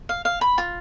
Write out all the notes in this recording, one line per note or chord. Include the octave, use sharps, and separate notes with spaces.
F5
F5
B5
F4